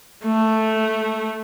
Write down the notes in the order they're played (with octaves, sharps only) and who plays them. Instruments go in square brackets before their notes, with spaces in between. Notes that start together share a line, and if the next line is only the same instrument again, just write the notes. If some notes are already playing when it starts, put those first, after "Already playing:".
[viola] A3